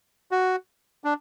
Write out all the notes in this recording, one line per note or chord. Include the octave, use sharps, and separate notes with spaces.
F#4
D4